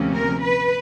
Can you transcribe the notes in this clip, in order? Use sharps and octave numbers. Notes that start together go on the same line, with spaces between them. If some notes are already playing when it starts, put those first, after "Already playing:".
Already playing: D2 C3 F3 A#3 C#4
A#4
B4